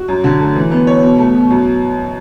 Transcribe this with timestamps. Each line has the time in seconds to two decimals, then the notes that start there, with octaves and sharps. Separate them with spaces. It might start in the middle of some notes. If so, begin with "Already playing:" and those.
Already playing: F#4
0.08 F#2
0.24 D3
0.40 A3
0.56 E3
0.71 B3
0.87 C#5
1.02 B2
1.18 A3
1.34 B2
1.50 F#2